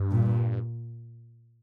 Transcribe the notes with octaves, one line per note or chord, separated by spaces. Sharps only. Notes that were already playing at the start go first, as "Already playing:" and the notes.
Already playing: G2
A#2